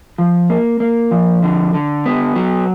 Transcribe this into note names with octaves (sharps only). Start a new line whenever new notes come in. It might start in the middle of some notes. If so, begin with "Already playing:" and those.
F3
A#3
A#3
F3
D3
D3
B3
F#3